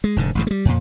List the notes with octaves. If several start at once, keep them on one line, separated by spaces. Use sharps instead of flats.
G#3
F1 G#2 D3
A1 G2 C3
G3 A3
F2 A#2